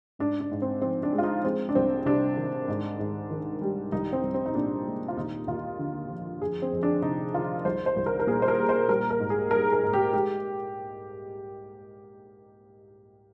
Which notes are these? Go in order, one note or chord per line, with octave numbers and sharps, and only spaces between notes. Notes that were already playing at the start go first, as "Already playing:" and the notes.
G#2 D4
D4
G#2
C4
F3 C4
D4
G#3
F4
D#4
G#3 C4
D4
C2 C4
C3 D4
D#3
G#2
G#2
D#3
G3
C2 D#4
C4
C2
C4
D#4
A#2 D4
G#3
F4
D#2 D#4
D#2 F4
D3
F3
F2 G#4
C4
F2
D4
C3 D#4
D#3 F4
C2 C5
C5
C2
A#4
A#4
A#2 G#4
C5
A#4
G3
C5
G3 A#4
A#4
G#2
G#4
G3 A#4
A#4
G#2
G4
G#3 G4